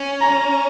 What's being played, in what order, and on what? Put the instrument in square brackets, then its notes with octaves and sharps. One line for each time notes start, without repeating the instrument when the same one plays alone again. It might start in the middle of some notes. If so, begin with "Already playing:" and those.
Already playing: [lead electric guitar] C#4
[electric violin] A#5